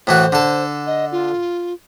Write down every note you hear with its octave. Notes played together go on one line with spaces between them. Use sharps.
A2 E3 F#4 C5
D3 A4
D#5
F4